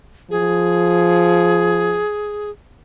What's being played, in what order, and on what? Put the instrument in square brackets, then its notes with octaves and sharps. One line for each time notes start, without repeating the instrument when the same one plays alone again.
[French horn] F3 [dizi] G#4